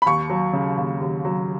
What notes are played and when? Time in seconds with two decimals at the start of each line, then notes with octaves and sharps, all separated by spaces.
0.02 B5
0.06 D#2 C#6
0.30 F#3
0.53 C#3
0.77 D#2
1.01 D#2
1.25 F#3